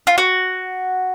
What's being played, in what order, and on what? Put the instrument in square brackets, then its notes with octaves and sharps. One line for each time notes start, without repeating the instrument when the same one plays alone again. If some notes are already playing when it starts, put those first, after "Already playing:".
[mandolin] F4
F#4